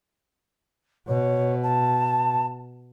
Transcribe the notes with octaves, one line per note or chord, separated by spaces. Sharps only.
B2 C#5
A5